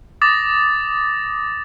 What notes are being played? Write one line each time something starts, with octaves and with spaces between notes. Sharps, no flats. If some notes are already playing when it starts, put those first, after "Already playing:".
D6 D#6 A6 A#6